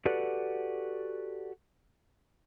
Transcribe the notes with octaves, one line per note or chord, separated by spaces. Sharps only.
F#4 G4 A4 B4 D5 F#5